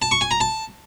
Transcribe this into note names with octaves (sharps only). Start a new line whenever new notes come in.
A5
C#6
G#5
A#5
A5